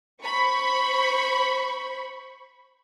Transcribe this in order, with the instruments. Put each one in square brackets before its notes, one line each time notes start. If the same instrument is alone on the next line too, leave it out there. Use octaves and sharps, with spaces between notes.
[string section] C5 B5 C#6